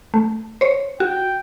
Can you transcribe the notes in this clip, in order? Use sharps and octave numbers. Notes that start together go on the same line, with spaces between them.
A3
C5 C#5
F#4 G5